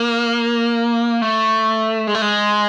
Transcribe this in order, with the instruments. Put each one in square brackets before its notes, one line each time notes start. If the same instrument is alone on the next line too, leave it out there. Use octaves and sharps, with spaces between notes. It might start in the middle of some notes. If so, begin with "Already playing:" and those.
Already playing: [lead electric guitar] A#3
A3
G#3
A3
G#3